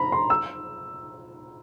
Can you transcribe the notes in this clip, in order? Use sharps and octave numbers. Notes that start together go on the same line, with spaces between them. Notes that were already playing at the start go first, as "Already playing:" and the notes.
Already playing: A#5 B5
C6
E6